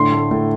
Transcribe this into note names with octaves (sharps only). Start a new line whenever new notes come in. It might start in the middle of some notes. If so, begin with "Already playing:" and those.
Already playing: A2 D3 C6
A3
A2